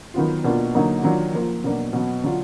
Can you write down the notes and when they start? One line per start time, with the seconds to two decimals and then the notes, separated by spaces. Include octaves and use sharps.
0.14 D#3 F#3 B3 F4
0.44 B2 A#3 D4 F4
0.75 D3 F#3 A#3 D#4
1.03 D#3 F#3 D4 F4
1.34 F3 A#3 F4
1.64 B2 F#3 A#3 D4
1.93 B2 F#3 B3
2.24 D3 F#3 D4 F4